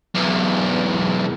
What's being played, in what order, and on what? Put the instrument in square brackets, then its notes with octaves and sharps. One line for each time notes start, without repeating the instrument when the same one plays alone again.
[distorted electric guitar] B1 E2